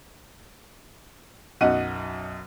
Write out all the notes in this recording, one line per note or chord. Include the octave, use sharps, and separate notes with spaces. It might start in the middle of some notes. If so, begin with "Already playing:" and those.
B1 F#2 D#4 D#5 F#5 D#7